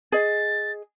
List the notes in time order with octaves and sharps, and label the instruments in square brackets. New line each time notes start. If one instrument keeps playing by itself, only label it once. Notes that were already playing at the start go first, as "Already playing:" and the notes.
[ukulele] G#4 D#5 [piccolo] A6